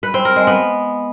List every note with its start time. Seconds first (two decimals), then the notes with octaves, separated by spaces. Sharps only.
0.03 B4
0.14 C4
0.25 A#4
0.36 G#3
0.47 B3